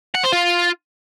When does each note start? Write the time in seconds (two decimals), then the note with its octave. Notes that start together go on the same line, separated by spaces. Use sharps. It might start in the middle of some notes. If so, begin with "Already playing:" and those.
0.15 F#5
0.24 C5
0.33 F4